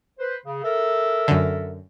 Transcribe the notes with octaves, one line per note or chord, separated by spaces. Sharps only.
B4 C5
C#3
A4 A#4 E5
F#2 D3